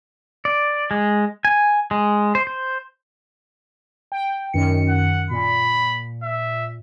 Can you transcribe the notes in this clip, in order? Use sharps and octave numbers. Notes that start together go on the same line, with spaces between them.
D5
G#3
G#5
G#3
C5
C5
G5
F#2 D#3 C#7
F#5
A#2 B5
E5